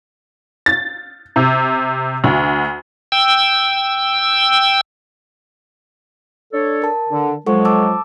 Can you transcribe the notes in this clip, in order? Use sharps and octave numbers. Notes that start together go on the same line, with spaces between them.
A6
C3
D2
G5 E6
D4 A4 C#5
A#4 A5
D3
F3 F#3 G#3 A4 F#5 C#6
A5 D6 E6